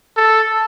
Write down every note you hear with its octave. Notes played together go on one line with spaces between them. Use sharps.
A4